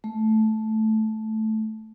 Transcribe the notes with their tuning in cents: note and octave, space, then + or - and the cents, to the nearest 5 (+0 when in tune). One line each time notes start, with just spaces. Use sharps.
A3 -10